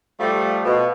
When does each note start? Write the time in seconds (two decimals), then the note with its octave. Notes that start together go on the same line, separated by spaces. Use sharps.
0.20 F3 G3 A3
0.64 B2